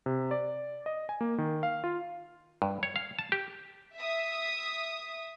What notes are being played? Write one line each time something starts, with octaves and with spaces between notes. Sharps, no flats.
C3
D5
D#5
G#5
A#3
D#3
F5
F4
G2
C#5
F5
A5
G4
E5 D#6